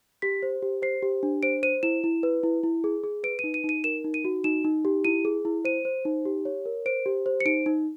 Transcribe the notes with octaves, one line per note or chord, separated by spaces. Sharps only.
G4 B6
C5
G4
C5 C7
G4
D4
C5 D7
C5 D#7
E4 E7
E4
B4
E4
E4
G#4
G#4
B4 D7
D#7
D#4
D#7
D#4
D#7
A#4 E7
D#4
D#7
F#4
D#4 E7
D#4
G4
E4 D#7
G#4
E4
C5 D#7
C5
D#4
G4
C#5
A#4
C5 D7
G4
C5
C#7
D#4 D7
D#4